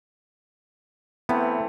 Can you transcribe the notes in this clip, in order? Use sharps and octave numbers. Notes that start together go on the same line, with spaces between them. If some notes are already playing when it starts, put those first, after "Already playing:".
E3 A3 B3 C4